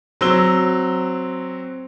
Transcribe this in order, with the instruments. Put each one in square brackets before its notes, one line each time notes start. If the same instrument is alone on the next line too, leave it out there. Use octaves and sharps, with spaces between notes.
[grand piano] F#3 C4 E6 G7